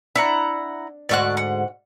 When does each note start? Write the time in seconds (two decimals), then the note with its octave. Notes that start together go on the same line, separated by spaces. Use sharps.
0.16 D4 E4 F#5 A#5
1.09 D2 G#2 F#4 D5 C#6 F#6
1.37 F#5